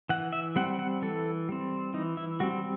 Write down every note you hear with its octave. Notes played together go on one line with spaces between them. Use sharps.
E3 F#5
E5
G3 C4 F#5
F#5
E3 A4
G3 C4
E3 D#4
E4
G3 C4 F#4